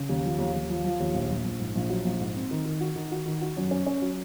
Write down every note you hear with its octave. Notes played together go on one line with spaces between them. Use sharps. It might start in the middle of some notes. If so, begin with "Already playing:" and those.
Already playing: C#3
D#2
F3
D#2
D#2
F3
F3
D#2
A#1
A#1
A#1
G#2
A#1
F#3
A#1
G#2
C4
D#3
D#3
F#4
D#3
F#4
D#3
F#4
F#2
C#4
C#4
F#3